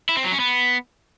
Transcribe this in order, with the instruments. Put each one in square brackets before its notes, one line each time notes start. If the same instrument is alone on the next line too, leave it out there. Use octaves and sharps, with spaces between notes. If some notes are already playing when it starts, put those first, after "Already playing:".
[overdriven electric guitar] E4
C4
F#3
C#4
B3